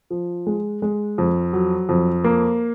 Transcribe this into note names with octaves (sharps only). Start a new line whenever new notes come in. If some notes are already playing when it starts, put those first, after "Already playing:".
F3
G#3
G#3
F2
F#3
F2
A#3